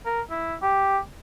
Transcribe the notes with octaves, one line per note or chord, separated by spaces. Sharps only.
A#4
E4
G4